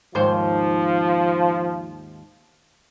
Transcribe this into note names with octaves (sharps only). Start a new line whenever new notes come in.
D#2 G#2 F3 C5